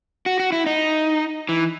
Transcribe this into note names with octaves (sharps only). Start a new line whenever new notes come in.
F#4
F#4
E4
D#4
E3